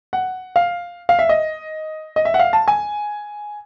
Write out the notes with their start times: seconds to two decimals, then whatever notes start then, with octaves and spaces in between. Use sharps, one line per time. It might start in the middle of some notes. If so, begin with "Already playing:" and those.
0.13 F#5
0.56 F5
1.09 F5
1.19 E5
1.29 D#5
2.16 D#5
2.25 E5
2.34 F#5
2.39 F5
2.53 A5
2.68 G#5